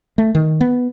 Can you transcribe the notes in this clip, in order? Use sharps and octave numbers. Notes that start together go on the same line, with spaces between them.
A3
D#3
B3